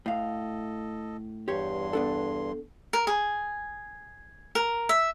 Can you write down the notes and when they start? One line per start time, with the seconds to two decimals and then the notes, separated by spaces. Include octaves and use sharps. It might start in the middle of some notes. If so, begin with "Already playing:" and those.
0.06 A2 A4 D#5 F5
1.48 E2 G2 G4 C#5 C6
1.93 B3 D4 A4
2.93 A#4
3.07 G#4
4.55 A#4
4.89 E5